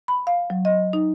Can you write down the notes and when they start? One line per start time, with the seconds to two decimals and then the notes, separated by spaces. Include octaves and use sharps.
0.08 B5
0.27 F5
0.50 F#3
0.65 D#5
0.93 D#4